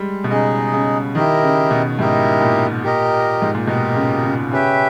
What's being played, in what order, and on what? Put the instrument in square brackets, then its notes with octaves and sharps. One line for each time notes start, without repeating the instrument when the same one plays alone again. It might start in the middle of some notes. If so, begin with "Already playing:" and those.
Already playing: [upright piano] G3 G#3
B2
[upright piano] C#3 [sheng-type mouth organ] D#4 G#4 D#5
[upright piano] C#3
[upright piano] D#3 [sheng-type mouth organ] E4 G4 A#4 D#5
[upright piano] C#3
B2
[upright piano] G#2 [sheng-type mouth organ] E4 G4 A#4 D#5
[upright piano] A#2
[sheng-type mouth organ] G4 A#4 D#5
[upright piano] G#2
A#2
[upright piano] B2 [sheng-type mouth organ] G4 A#4 D#5
[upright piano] C#3
C#3
[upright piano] C#3 [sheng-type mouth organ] C#4 G4 B4 E5 G5